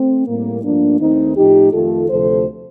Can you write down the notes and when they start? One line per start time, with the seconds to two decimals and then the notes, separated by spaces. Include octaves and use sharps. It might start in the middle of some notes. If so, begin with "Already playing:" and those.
Already playing: A3 C4
0.26 A2 G3 A#3
0.63 G2 F3 A3 A#3 D4
0.99 D#2 D#3 A3 C4 D#4
1.36 A2 F3 A3 D#4 G4
1.72 F2 D#3 A3 F4 A4
2.08 D2 C3 F3 A3 A4 C5